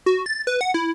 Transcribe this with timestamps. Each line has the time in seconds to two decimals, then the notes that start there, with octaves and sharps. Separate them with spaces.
0.06 F#4
0.26 A6
0.47 B4
0.61 F#5
0.74 E4